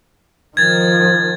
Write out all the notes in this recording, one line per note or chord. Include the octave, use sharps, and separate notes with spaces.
D#3 F3 G#6 A6